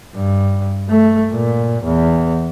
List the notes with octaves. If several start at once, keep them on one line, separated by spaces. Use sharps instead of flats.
G2
A3
A#2
E2